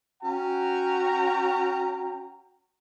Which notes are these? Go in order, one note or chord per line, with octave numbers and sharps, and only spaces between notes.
C#4 F#4 G5 A#5